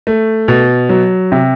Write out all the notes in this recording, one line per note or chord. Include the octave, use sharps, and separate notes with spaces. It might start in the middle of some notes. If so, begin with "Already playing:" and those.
A3
B2
F#3
C3